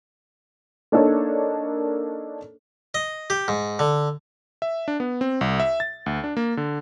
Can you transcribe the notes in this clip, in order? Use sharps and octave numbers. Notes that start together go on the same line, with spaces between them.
A#3 D4 D#4 A4 A#4 C#5
D#5
G4
G#2
D3
E5
D4
B3
C4
C2
E5
A6
D2
D4
A#3
D3